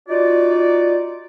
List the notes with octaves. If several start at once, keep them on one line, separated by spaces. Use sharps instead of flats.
D#4 F4 F#4 D5